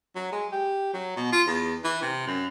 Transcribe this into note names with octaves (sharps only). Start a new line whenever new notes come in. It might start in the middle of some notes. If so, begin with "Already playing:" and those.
F#3
G#3
G4
F#3
B2
F4
E2
E3
C3
F#2